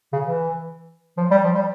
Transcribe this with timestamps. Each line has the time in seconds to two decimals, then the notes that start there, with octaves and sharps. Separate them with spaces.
0.13 C#3
0.24 E3
1.17 F3
1.31 G3
1.44 F3
1.55 G3